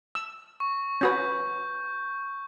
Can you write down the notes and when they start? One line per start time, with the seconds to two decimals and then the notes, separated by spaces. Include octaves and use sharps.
0.15 E6
0.60 C#6
1.01 C#4 F#4 B4 G6